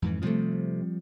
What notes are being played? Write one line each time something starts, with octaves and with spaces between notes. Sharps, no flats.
F2 G#2 E3
C3 F3 G3 A3 C4